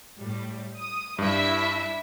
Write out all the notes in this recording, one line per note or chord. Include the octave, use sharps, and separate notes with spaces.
A2 G3
D#6
G2 D4 E4 E5